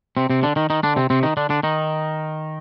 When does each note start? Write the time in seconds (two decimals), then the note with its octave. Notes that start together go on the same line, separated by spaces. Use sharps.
0.17 C3 C4
0.30 C3 C4
0.43 D3 D4
0.56 D#3 D#4
0.70 D#3 D#4
0.83 D3 D4
0.96 C3 C4
1.10 C3 C4
1.23 D#3 D#4
1.37 D3 D4
1.50 D3 D4
1.63 D#3 D#4